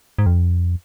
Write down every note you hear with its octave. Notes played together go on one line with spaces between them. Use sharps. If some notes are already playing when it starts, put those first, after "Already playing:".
G#2
F2